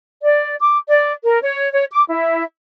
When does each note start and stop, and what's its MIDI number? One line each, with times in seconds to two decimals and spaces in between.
0.23 0.56 74
0.61 0.78 86
0.88 1.13 74
1.24 1.39 70
1.43 1.71 73
1.73 1.85 73
1.92 2.04 86
2.09 2.43 64